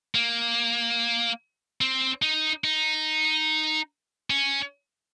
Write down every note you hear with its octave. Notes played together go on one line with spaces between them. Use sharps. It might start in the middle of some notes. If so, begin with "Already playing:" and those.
A#3
C4
D#4
D#4
C#4